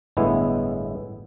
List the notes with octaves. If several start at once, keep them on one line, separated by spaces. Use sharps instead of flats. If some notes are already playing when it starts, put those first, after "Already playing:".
G1 A2 G#3 B3 E4